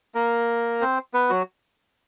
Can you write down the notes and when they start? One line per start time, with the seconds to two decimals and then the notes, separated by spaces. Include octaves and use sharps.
0.15 A#3 A#4
0.81 C4 C5
1.14 B3 B4
1.30 F#3 F#4